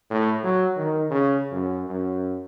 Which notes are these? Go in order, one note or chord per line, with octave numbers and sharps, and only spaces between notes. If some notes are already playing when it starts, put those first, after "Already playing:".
A2
F#3
D#3
C#3
F#2
F#2